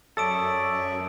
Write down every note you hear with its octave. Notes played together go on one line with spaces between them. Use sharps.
F#2 A4 C#5 D5 E5 A5 D#6 D7